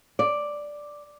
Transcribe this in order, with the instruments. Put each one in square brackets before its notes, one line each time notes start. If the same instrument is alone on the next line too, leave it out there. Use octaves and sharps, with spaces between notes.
[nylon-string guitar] D5